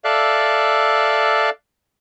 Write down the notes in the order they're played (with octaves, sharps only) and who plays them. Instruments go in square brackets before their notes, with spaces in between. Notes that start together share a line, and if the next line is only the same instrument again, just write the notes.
[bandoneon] A4 D5 E5 F5 F#6